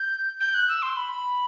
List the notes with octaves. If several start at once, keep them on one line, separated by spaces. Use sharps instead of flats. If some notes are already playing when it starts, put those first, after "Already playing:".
Already playing: G6
G6
F#6
E6
C6
B5